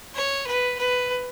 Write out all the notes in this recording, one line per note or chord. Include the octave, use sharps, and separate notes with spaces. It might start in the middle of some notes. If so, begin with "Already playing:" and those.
C#5
B4
B4